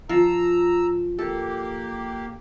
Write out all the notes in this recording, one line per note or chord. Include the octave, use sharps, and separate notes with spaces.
F3 A#5 E6
A#3 G4 A4